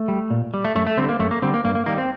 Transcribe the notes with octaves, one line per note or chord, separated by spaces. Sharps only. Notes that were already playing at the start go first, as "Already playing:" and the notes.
Already playing: A3
G3
A#2
G3
A3
F#2 A3
A3
D3 G3 C4
A#3
F#2 A3
A#3
D3 G3 C4
A#3
G2 A#3
A#3
D#3 G3 A#3
C4